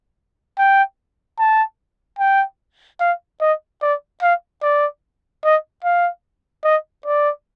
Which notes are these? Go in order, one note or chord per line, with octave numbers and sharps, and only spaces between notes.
G5
A5
G5
F5
D#5
D5
F5
D5
D#5
F5
D#5
D5